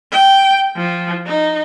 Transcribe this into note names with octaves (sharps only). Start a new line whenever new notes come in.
G5
F3
D#4